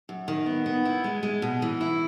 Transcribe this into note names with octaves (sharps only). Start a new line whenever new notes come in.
F#2
D#3
B3
B3
E4
G#3
G#3
B2
E3
E4